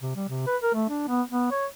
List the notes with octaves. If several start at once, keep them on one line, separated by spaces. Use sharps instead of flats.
C3
G3
C3
B4
A#4
A3
D4
B3
B3
C#5